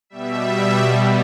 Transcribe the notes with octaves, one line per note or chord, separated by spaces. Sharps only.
B2 G3 E5
B2 G3